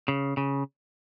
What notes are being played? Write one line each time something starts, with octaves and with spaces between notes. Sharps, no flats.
C#3
C#3